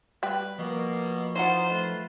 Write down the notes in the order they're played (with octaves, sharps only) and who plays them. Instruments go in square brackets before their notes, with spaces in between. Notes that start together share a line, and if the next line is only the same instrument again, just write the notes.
[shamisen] G3 G5 [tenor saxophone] B4
[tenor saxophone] B2 [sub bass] F3 [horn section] A#3
[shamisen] E3 F#3 F#5 [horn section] D#4 F4 [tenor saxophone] C5
[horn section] A3 F4 B4